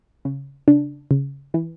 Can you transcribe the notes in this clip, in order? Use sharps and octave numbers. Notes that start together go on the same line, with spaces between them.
C#3
C#3 D4
C#3
E3